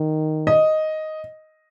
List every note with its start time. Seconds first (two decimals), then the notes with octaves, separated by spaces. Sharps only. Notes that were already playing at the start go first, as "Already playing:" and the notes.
Already playing: D#3
0.47 D#5